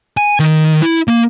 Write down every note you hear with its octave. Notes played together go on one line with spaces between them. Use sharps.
G#5
D#3
E4
A#3